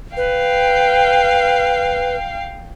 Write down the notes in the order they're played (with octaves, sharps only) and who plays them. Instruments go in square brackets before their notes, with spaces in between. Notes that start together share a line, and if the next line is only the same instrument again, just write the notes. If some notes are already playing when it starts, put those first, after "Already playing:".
[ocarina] B4 [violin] F5 G5